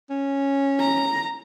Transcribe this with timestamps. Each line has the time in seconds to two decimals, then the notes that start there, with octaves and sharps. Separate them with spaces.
0.10 C#4
0.80 A#5